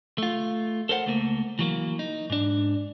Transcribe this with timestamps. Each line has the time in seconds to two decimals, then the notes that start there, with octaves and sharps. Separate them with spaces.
0.18 A3 F4
0.89 A4 A#4 C5 F#5
1.06 C#2 A3 A#3
1.59 E3 F#3 A#3
1.99 D#4
2.30 G#2 D4